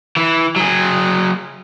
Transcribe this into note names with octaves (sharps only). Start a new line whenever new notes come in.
E3
F#3 G#4